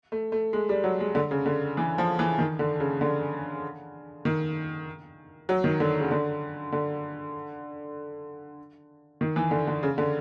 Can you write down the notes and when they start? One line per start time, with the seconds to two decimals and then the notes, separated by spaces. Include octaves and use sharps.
0.12 A3
0.32 A3
0.53 G#3
0.69 G3
0.84 F#3
1.00 G#3
1.15 D3
1.31 C#3
1.46 D3
1.77 E3
1.98 F3
2.19 E3
2.38 D#3
2.59 D3
2.80 C#3
3.01 D3
4.25 D#3
5.49 F#3
5.64 D#3
5.80 D3
6.00 C#3
6.11 D3
6.72 D3
9.21 D#3
9.36 E3
9.51 D3
9.67 D3
9.83 C#3
9.98 D3